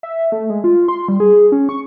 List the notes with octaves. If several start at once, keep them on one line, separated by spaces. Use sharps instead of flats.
E5
A3
G#3
F4
C6
G3
G#4
C#4
C#6